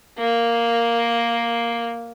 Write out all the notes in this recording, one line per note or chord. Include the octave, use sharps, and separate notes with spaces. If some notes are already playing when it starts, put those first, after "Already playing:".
A#3